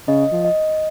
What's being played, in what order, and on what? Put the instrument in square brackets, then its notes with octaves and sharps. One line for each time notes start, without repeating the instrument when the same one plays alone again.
[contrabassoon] C#3 [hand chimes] D#5
[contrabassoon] F3
[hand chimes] D#5